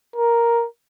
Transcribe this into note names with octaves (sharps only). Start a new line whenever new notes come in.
A#4